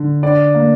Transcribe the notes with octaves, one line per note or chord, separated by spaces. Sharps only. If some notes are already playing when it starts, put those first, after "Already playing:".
Already playing: D3
D4 D5
A#3